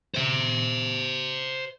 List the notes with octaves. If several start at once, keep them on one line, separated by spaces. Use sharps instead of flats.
C5 E5